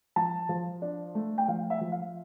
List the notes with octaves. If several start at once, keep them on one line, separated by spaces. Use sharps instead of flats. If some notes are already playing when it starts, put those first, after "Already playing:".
F3 A5
F3
D4
A3
G5
F3 F5
E5
F3
F5